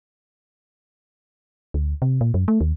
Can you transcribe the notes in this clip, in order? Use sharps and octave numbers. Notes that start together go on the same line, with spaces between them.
D2
C3
A#2
F#2
A3
D#2